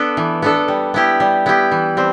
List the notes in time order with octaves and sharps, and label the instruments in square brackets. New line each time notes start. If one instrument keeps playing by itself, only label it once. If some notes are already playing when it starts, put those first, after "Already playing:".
Already playing: [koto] B3 D4 A4
E3
B3 D4 A4
G3
B3 E4 G4
G3
B3 E4 G4
E3
G3 C4